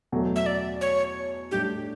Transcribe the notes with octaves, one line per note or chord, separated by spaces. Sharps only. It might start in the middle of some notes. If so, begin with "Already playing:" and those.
E2 B2 F#3 A3
E5
D5
C#5
A2 G3 D4 G4